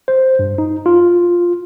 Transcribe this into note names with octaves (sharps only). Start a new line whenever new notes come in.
C5
G2
D#4
F4